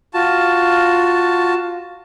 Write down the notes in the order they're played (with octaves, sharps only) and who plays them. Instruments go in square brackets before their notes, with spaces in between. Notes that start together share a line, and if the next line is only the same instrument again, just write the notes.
[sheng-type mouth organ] F4 F#4 A5